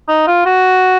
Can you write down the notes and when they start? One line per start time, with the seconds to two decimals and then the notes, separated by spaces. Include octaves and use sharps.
0.08 D#4
0.27 F4
0.45 F#4